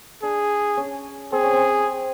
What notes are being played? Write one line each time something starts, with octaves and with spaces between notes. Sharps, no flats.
D4 G#4
C#4
C4 G#4
C#4
C4